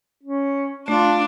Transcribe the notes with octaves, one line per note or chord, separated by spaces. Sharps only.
C#4
A3 D4 F4